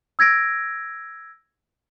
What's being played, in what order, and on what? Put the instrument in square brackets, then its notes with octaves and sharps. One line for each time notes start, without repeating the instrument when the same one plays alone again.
[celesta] E6 G#6 A#6 D7